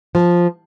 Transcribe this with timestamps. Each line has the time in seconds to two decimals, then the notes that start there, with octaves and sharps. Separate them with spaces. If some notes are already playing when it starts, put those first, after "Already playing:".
0.15 F3